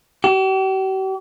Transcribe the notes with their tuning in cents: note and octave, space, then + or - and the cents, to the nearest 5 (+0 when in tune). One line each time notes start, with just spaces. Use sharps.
G4 -45